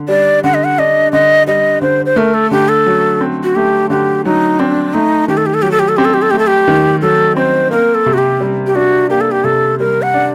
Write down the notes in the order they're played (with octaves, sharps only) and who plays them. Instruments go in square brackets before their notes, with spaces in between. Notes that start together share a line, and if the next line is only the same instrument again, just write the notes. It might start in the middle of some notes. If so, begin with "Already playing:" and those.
Already playing: [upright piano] D3
[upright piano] G3 [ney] D5
[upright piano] D3 [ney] F#5
[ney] D#5
F#5
[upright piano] D4 [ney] D#5
[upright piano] D3 [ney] D#5
[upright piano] G3 [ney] D#5
[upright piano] D3 [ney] C5
[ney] C5
[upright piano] A3 [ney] A#4
[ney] A4
[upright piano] D3 [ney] G4
[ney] A4
[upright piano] F#3
C4
[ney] F#4
[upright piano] A3 [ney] G4
[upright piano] D3 [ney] G4
[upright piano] F#3 [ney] D#4
[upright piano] C4 [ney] D4
[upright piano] A3 [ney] D#4
[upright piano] D#3 [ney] G4
[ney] A4
G4
A4
[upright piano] F#3 [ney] G4
[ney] A4
G4
A4
[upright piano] C4 [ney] G4
[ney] A4
G4
A4
[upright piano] A3 [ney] G4
[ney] A4
G4
[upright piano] D#3
[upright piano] F#3 [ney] A4
[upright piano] C4 [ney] C5
[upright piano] A#3 [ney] A#4
[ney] A4
[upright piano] C3
[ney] F#4
G4
[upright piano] G3
[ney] G4
[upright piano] D4 [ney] F#4
[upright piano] A#3 [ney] G4
[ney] A4
G4
[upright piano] C3 [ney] A4
[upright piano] G3 [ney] A#4
[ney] F#5
[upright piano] D4